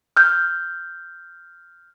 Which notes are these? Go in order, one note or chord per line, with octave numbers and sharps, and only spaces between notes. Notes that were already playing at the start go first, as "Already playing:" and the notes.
F6 G6